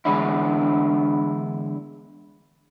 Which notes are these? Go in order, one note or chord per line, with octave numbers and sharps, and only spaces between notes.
D3 E3 G#3 B3 D4 E4